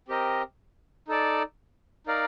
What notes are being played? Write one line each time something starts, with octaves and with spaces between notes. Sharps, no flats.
C4 G4 A#4 D#5
D#4 A4 D5
D#4 A#4 D5 F5